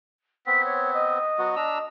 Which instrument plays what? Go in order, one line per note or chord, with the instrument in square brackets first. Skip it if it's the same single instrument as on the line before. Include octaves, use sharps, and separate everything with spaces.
[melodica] B3 C4 [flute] B6
[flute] C#5
D#5
[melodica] F#3 B3 F#4
D4 A#5 E6